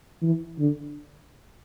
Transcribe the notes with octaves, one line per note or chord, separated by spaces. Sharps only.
E3
D3